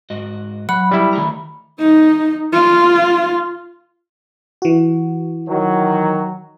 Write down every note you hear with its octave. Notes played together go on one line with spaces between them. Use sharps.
G#2 F#4 D#5
F#3 F#5 B5
G3 E4
D#3 A3 A#5
D#4
F4
E3 F#4
D#3 F#3